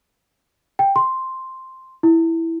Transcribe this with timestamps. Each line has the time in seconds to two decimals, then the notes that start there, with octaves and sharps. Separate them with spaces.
0.79 G5
0.96 C6
2.03 E4